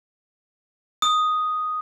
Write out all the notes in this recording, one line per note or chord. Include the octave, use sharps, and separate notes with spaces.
D#6